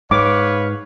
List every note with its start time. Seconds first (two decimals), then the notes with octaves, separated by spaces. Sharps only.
0.11 G#2 B4 C#5 F5 D6